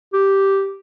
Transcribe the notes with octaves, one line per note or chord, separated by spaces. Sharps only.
G4